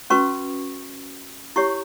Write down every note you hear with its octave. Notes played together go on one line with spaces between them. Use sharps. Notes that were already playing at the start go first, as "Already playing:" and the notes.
C#4 F#4 B4 C#6
E4 G4 C#5 C#6